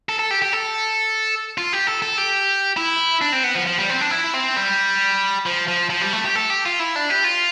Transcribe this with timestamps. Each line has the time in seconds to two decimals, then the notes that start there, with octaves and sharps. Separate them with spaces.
0.09 A4
0.19 A4
0.31 G4
0.42 G4
0.53 A4
1.58 F4
1.73 G4
1.87 A4
2.02 A4
2.18 G4
2.77 E4
3.21 D4
3.32 C4
3.44 B3
3.55 F3
3.66 F3
3.78 G3
3.90 C4
4.01 D4
4.11 E4
4.34 C4
4.56 G3
5.46 F3
5.68 F3
5.90 F3
6.01 G3
6.13 A3
6.25 G4
6.35 A4
6.50 G4
6.66 F4
6.80 E4
6.96 D4
7.10 G4
7.24 F4